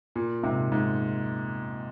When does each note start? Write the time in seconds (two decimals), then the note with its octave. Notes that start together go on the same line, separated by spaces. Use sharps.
0.16 A#2
0.43 G#2 C3
0.72 G#2